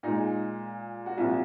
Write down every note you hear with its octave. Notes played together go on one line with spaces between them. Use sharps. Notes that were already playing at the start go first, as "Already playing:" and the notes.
A#2 G#3 D#4
F#4
C2 A#2 F3 F4
F#4